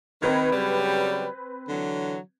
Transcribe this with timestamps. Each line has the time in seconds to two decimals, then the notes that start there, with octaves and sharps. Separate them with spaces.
0.22 D#3 C4 B4 G#6
0.52 C#3 F#3 G3
1.69 D3 E3 F#3